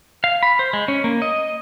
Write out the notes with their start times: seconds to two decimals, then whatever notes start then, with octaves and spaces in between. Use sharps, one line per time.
0.24 F5
0.43 B5
0.59 C5
0.73 G#3
0.88 C#4
1.04 A#3
1.22 D#5